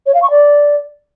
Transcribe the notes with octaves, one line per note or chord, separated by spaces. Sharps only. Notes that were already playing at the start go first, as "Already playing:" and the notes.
C#5
F5
C#6
D5